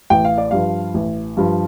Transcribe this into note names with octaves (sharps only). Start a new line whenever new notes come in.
A1 G5
F5
D5
G2 F3 F5
A1
G2 F3